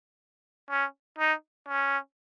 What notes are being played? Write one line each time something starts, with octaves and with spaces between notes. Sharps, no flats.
C#4
D#4
C#4